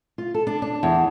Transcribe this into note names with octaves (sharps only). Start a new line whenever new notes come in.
F4
A4
D4
D4
E2